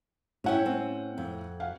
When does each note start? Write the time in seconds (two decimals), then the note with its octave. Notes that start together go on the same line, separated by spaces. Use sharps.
0.44 A2 C#4 E4 C#5 F#5 G5
0.65 C4 C#4
1.18 F2
1.60 F5 F#5